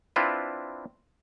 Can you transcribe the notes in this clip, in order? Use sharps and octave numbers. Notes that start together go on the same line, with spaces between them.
C4 D4 E4 F4 B4